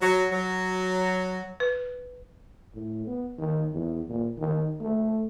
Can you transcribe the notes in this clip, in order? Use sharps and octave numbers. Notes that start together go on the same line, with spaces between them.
F#3
F#3
B4
A2
B3
D#3
E2
A#2
D#3
A3